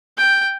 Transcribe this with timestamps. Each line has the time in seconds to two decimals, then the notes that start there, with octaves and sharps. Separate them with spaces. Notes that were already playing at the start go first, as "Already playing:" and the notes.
0.17 G5